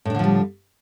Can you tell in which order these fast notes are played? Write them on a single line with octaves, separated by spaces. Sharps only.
A2 D4 D3 F3 G3